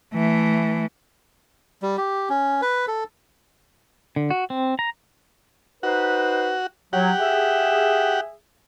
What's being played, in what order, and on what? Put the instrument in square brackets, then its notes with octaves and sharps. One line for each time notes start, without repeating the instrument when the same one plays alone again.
[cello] E3 A3
[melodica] G3
G4
C#4
B4
A4
[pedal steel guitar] D3
F#4
C4
A#5
[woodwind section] D#4 B4 C5 [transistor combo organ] F#4
[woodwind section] F#3 [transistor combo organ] G4 F#5
[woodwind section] G#4 E5